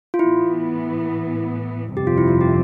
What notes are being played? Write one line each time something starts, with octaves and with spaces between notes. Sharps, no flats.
F4
A2 E3 B3 E4
G1 F2 C3 G4
F4
E4
F4
G4